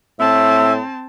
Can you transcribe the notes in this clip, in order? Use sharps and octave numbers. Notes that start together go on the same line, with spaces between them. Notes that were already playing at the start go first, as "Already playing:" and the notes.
A2 C4 E5 A5